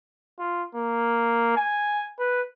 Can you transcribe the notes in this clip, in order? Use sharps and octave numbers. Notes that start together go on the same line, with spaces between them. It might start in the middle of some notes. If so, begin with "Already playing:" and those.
F4
A#3
G#5
B4